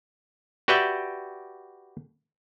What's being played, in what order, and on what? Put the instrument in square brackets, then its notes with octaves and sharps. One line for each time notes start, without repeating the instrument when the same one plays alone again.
[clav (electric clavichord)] F#4 G4 B4 D5 E5 G5